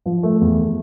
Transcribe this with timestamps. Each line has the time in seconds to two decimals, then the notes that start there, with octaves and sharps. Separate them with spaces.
0.06 F3
0.23 A3
0.41 E2